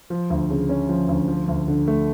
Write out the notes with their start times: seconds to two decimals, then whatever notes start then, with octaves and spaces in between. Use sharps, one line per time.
0.10 F3
0.30 D2
0.50 C#3
0.69 C#4
0.89 F3
1.09 D2
1.28 F3
1.48 D2
1.68 D3
1.88 A3